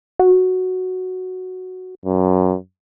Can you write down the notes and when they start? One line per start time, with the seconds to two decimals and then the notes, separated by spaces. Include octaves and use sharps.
0.19 F#4
2.06 F#2